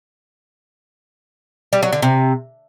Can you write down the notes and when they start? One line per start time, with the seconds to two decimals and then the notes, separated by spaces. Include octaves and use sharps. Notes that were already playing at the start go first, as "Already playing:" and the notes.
1.73 G3
1.83 F#3
1.92 D3
2.02 C3